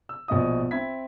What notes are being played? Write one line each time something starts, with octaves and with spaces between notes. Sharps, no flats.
E6
A#1 B2 D#5 D#6
C4 E5 B5 G#6 B6